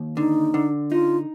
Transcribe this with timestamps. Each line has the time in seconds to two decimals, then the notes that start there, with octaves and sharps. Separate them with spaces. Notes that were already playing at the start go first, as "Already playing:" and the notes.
Already playing: D#2
0.17 D3 D#4
0.54 D3
0.91 D#4 F4